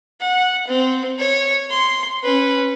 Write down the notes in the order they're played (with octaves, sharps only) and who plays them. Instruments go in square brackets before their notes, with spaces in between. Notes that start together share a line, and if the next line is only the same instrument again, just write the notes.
[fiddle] F#5
C4
C#5
C6
C#4 B4